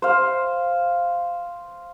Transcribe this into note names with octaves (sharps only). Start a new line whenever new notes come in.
C5 F5